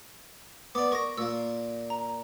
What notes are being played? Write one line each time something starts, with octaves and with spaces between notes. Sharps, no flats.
B3 D5 D6
A#4 C#6 A#6
A#2 A#3 E6
A#5